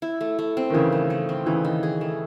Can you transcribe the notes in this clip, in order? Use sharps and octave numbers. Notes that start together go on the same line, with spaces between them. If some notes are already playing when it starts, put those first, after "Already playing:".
E4
A3
A3
C4
D#3
C#3 E3 E4
A3
A3
C4
C#3 E3 D#4
D#3
G#4
A3